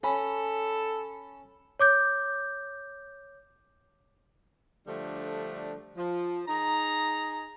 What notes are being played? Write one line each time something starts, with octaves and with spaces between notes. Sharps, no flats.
C#4 A4 B5
C#5 D6 G6
D3 F3 G3 A3 D4
F3
D#4 G#4 A#5